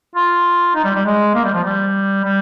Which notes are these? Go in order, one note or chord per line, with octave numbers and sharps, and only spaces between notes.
F4
D#4
G3
G3
G#3
A#3
G3
F3
G3
G3